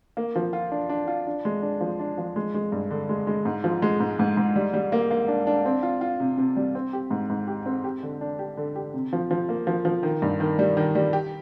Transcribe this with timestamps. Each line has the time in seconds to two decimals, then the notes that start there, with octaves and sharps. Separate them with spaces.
0.17 A#3
0.35 F3
0.53 F4
0.71 D4
0.89 D4
1.07 F4
1.27 D4
1.45 G#3
1.62 D4
1.81 F3
2.00 D4
2.18 F3
2.36 G#3
2.54 G#3
2.72 G2
2.91 D3
3.09 G#3
3.27 G#3
3.45 G#2
3.64 F3
3.82 G#3
4.00 G#2
4.19 G#2
4.37 G#2
4.56 G3
4.74 G3
4.92 A#3
5.11 A#3
5.28 D4
5.47 D4
5.65 C4
5.83 F4
6.01 F4
6.20 C3
6.37 C3
6.56 G3
6.75 C4
6.93 G4
7.11 G#2
7.30 G#2
7.47 G4
7.66 C4
7.84 G4
8.03 D3
8.21 D4
8.39 G4
8.57 D3
8.76 G4
8.94 C3
9.13 F3
9.31 F3
9.49 A#3
9.67 F3
9.85 F3
10.03 D#3
10.22 G2
10.40 D#3
10.59 G3
10.77 D#3
10.95 G3
11.13 G4